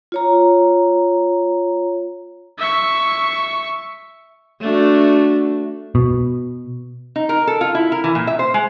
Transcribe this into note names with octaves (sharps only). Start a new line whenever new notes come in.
F4 C#5 A#5
E5 C#6
A3 D4 F#4
B2
D#4
A#4
A4
F4
E4
A#4
E3
A#2
E5
C5
G#3